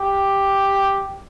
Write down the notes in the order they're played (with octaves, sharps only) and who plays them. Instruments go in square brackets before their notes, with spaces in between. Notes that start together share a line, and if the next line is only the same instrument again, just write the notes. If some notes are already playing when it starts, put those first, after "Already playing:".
Already playing: [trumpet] G4